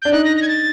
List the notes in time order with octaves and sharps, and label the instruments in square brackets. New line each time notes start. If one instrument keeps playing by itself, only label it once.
[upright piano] D4 [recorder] G6
[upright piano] D#4 [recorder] F#6
[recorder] A#6
A#6
G#6
A6